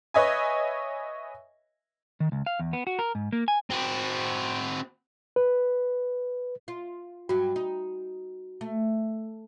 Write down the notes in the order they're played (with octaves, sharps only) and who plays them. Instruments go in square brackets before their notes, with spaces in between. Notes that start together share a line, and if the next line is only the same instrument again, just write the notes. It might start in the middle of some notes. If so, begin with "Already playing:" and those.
[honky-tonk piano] B4 C#5 D#5 E5 G#5
[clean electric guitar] D#3
C#2
F5
E2
B3
F#4
A#4
G#2
A#3
G#5
[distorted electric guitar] C4 F#4
[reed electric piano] B4
[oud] F4
[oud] G2 F#3 [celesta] F#4
[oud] D#4
A3